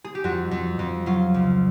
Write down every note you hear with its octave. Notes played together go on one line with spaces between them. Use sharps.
G#4
G4
F2 F#4
F2
F2
F#3 F4
C#2